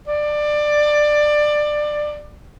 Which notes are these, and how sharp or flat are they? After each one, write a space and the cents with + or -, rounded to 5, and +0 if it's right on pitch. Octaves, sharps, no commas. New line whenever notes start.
D5 +20